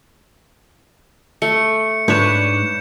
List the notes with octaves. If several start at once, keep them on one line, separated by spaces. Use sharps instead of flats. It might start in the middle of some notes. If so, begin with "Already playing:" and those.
A3 C#7
G#2 D4 B4 C#5 G6 E7